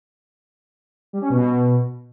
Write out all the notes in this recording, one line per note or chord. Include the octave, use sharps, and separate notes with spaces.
G3
C#4
B2